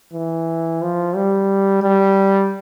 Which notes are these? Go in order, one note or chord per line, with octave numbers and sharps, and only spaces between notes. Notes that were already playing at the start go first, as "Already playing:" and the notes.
E3
F3
G3
G3